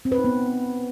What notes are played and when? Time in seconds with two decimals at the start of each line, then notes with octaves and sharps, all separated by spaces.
0.05 C4
0.12 B4
0.18 D#4
0.24 B3